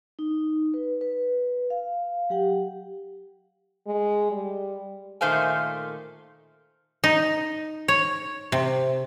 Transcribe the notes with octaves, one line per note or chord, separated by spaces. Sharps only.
D#4
B4
B4
F5
F#3 G4 F#5 G5
G#3
G3
A#2 D#3 A3 C5 F5 G#5
D#4
C#5
C3